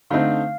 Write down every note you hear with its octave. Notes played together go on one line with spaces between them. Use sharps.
D3 A3 C4 D#4 F5